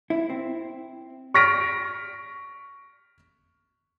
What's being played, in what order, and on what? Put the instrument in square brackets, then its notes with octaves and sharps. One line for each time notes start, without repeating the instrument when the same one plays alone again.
[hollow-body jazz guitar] E4
C4
[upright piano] C#6 F6 A#6 B6 D7